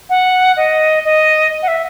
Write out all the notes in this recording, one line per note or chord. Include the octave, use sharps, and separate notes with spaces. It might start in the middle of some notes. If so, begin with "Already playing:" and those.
F#5
D#5
D#5
F#5
E5